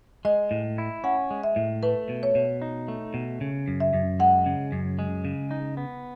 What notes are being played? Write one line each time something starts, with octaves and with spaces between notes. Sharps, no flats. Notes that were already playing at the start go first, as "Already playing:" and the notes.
G#3 D#5
A2
E4
C#4 F#5
G#3
E5
A2
A3 B4
B2
C#5
B2
D#4
A3
B2
C#3
F#2
E5
F#2
G#3 F#5
C#3
F#2
G#3
C#3
D#4
B3